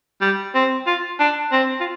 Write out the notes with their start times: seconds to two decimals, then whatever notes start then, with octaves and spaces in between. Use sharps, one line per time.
0.21 G3
0.54 C4
0.87 F4
1.20 D4
1.52 C4
1.80 F4